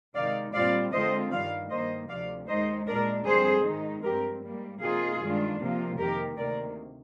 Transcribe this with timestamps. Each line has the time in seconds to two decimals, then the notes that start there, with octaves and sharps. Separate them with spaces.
0.14 C3 D#3 G#3 D#4 D5 F5
0.53 A#2 G3 C4 F4 D5 F5
0.92 D3 G#3 C4 F4 C5 D#5
1.31 G2 D#3 G3 D5 F5
1.70 G2 D#3 A#3 C5 D#5
2.09 D2 C3 F3 D5 F5
2.48 D#2 D#3 G#3 D#4 C5 D#5
2.86 A#2 G#3 D4 A#4 D5
3.25 F2 D3 G3 C4 G#4 C5
3.65 G#2 D#3 G#3 D#4
4.04 G2 F3 C4 G4 A#4
4.43 G#2 G3 A#3
4.81 C3 F3 A#3 D#4 F4 G#4
5.20 G2 D#3 G#3 D4 F4
5.60 C3 F3 A#3 F4
5.98 F2 C3 D#3 A#3 G4 A#4
6.37 D2 C3 D#3 A#3 A#4 D5